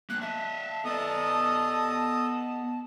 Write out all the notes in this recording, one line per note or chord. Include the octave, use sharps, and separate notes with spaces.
F3 A#3 F#6
D#5 E5 A5
B3 A4 D5 D#5 D#6